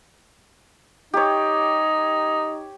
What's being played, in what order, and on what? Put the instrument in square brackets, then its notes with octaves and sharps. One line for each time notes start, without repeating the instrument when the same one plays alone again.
[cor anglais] D#4 [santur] G4 C#5